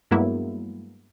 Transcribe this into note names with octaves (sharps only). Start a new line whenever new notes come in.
G2 F#3 G#3 A#3 B3 E4